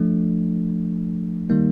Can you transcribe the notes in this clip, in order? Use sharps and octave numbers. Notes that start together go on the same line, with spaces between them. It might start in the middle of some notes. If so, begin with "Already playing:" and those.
Already playing: F3 A3 D4
D#3 G3 A#3 D#4